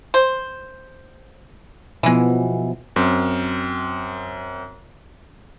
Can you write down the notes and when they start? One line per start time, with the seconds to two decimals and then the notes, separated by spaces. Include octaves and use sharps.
0.14 C5
2.03 B2 E3 F3 G#3 B3
2.96 F#2 C4